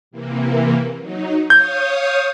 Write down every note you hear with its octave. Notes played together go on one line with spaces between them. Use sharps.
C3 E3 A#3
F#3 D#4
C#5 F5 D#6 G6